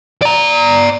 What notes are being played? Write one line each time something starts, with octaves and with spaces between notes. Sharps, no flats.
D5 A#5